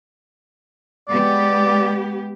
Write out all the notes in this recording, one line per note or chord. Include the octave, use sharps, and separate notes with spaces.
G#3 B3 G4 D5